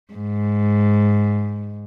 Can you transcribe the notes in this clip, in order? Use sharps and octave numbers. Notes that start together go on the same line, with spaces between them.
G#2